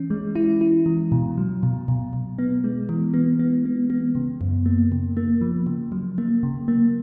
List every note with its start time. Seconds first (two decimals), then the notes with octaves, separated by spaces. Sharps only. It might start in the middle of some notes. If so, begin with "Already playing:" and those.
Already playing: E3 C#4
0.10 G#3
0.35 E4
0.61 E4
0.86 E3
1.12 B2
1.38 F#3
1.63 B2
1.88 B2
2.13 B2
2.39 B3
2.64 G#3
2.89 E3
3.14 B3
3.39 B3
3.65 B3
3.90 B3
4.15 C#3
4.41 F#2
4.66 A#3
4.92 C#3
5.17 A#3
5.41 F3
5.67 C#3
5.92 F#3
6.18 A#3
6.43 C#3
6.68 A#3